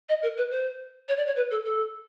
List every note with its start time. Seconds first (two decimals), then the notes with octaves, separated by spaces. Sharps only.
0.09 D#5
0.22 A#4
0.37 B4
0.50 C5
1.08 C#5
1.17 D5
1.26 C#5
1.36 B4
1.50 A4
1.65 A4